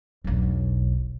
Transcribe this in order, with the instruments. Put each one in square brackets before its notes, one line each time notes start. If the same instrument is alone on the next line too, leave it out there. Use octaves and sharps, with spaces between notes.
[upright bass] E1 B1